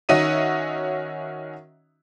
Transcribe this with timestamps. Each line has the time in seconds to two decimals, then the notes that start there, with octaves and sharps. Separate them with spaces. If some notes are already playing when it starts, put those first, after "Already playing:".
0.09 D#3 C#4 F#4 D#5 E5 D#7